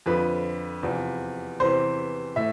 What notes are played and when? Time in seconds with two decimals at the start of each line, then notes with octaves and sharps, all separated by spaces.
0.06 F2 D3 F3 B4
0.83 E2 C3 F3
1.60 E2 C3 E3 C5
2.36 A2 E5